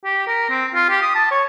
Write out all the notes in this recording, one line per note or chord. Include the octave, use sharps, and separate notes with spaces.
G4
A#4
C4
F4
G4
D#6
A5
C#5